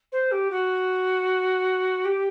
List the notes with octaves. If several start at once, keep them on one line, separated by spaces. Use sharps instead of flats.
C5
G4
F#4
G4